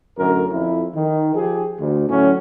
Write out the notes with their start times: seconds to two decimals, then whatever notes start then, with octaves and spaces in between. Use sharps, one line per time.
0.19 F#2 A2 D3 A#4
0.51 F2 E4
0.95 D#3
1.34 F3 G4 G#4
1.80 D2
2.09 A2 F#3 C#4